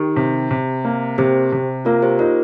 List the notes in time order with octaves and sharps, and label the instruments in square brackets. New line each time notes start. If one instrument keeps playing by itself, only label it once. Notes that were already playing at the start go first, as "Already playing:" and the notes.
Already playing: [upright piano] D#3 [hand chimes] G4
[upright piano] C3
C3
A#3
[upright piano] C3 [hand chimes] G4 C5
[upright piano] C3
[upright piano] A#3 [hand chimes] F4 A#4
[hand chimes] G4 C5
[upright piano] D#4 [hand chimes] F4 A#4